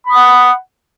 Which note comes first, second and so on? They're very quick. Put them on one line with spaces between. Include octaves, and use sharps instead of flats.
B5 D#6 F#5